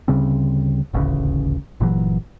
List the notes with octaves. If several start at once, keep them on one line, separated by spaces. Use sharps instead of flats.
D2 C#3 G3 C4
D#1 A1 D2 C#3
G1 A#2 E3 F#3